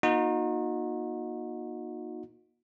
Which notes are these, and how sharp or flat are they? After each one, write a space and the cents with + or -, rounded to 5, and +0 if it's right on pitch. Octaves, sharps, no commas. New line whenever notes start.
A#3 +35 D#4 +0 F#4 -40